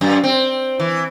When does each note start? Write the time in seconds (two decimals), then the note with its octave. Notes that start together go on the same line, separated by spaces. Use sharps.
0.01 F#2
0.24 C4
0.80 E3